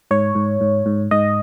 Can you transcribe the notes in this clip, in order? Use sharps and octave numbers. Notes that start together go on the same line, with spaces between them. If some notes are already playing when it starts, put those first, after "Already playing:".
G#2 C#5
G#2
G#2
G#2
G#2 D#5